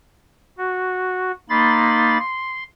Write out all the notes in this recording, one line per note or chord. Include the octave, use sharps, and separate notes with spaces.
F#4
A#3 D#4 B5 C6 A6
C6